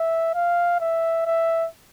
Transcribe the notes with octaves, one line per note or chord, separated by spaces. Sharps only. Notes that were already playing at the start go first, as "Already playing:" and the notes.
Already playing: E5
F5
E5
E5